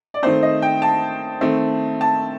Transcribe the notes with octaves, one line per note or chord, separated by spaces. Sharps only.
D5
D#3 A3 C4 C5
D#5
G5
A5
D#3 A3 C4
A5